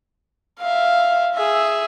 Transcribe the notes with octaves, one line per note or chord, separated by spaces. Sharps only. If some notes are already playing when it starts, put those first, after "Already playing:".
E5 F5
G#4 E5